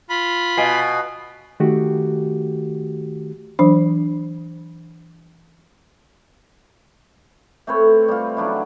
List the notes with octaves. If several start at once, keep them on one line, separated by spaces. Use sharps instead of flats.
F4 B5
B2 F5 G#5
D#3 A3 F#4 G4
E3 F#3 D4 C5
A3 C4 B4 C#5
G3 F4
C#3 F#3 D4 E4